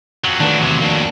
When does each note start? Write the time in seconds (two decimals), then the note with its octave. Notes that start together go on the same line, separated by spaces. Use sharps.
0.24 F2 F#3
0.40 D#3 A3 B3 D4
0.59 E2 C3
0.82 A#3 D4